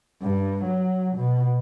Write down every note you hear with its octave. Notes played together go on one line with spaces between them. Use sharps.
G2
F#3
B2